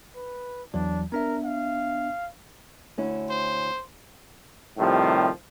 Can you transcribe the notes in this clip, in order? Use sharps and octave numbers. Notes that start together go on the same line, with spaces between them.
B4
E2 E3 F#3 D4
B3 D4 A#4 E5
F5
D2 C#4 E4
C5
A2 C3 D#3 F3 G3